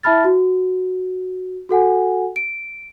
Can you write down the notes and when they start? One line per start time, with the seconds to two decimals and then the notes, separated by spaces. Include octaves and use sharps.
0.03 E4 E5 A5 B5 F6 A6
0.24 F#4
1.69 F#4 A4 F#5 G#5
2.36 D7